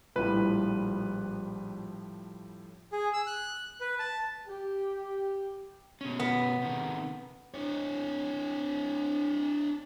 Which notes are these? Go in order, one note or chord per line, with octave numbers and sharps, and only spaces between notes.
A#1 A2 F3 G3 B4
G#4
E6
F#6
B4
A5
G4
B2 C#4
B3
C3 D#3
D4 C#5